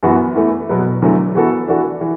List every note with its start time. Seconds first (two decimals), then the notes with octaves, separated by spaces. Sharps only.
0.03 F#2 E3 B3 F#4
0.35 E2 E3 A3
0.69 B2 F#3 B3
1.02 E2 D3 F#3 A3
1.35 E3 B3 F#4 A4
1.68 E3 D4 F#4 A4
2.01 E3